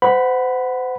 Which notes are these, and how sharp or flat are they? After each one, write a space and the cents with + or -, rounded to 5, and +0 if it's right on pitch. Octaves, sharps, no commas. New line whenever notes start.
C5 -35 F#5 +0 B5 +0